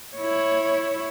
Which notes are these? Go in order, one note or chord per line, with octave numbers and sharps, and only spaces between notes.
E4 C#5